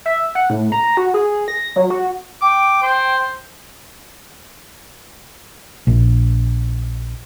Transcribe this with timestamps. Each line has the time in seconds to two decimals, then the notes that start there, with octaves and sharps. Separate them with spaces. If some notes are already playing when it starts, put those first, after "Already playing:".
0.05 E5
0.35 F#5
0.50 A2
0.72 A#5
0.97 F#4
1.14 G#4
1.48 A#6
1.76 F#3
1.90 F#4
2.41 G5 D6
2.82 C5
5.87 A#1